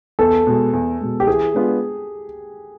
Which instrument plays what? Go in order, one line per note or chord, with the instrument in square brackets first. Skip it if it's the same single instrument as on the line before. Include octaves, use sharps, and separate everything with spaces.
[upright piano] E2 [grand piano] A4
[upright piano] B2 G#3
E2
B2 G#3
[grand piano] G4
[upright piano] E3 [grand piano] G#4
[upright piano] G#3 B3 D4 F4